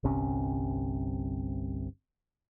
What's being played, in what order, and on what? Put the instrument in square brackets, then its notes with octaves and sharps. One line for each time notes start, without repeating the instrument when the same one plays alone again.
[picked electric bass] G1 C2 C3 C#4